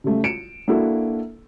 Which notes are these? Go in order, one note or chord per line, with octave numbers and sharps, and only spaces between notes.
C#3 G3 A3
C#7 D7 E7
A#3 D4 E4 F#4 A4